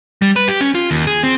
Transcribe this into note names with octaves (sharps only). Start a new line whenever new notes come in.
G3
B4
G4
C#4
F4
D#2
G#4
C4